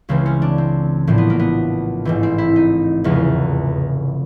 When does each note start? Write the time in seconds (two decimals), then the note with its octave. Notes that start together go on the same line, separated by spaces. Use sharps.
0.09 C#2 C#3 E3 C4
0.26 C#4
0.42 D4
0.58 C4
1.07 A#1 A2 F3 C4
1.18 B3
1.30 A#3
1.40 B3
2.05 A1 G#2 E3 C4
2.23 C4
2.38 E4
2.56 D#4
3.04 F1 E2 C#3 F3